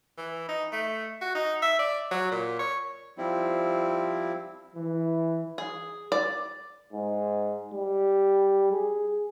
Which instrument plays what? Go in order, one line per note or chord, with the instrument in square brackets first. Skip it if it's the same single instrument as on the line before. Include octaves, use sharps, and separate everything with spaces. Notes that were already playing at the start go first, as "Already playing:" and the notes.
[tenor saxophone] E3
D#4
A3
F#4
D#4
E5
D5
F#3
A#2
C#5
[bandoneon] F3 G3 C4 E4
[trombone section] E3
[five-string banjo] G#4
D5
[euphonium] G#2
G3
G#4